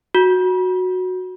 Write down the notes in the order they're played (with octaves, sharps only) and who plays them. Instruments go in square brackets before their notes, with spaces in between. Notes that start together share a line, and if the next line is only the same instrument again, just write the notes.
[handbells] F#4